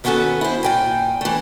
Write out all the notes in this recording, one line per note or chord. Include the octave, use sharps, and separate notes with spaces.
D#3 B3 C#4 D4 F#4 A4
E4 C5
A#2 G5 G#5
E3 A3